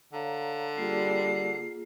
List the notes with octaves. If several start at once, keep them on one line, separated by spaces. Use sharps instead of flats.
D3 C#5 F5 A#5
G3 A#3 F4 G#4 C7